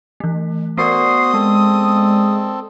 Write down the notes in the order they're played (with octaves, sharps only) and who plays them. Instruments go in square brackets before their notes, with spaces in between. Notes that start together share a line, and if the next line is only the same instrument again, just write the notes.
[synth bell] E3 A3
[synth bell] B3 A#4 D5 [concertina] F#4 C5 [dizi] D#6 [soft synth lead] C7
[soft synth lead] G#3 [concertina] C4 A4